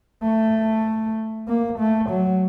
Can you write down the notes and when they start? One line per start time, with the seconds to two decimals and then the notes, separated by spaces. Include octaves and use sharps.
0.23 A3
1.48 A#3
1.79 A3
2.10 F#3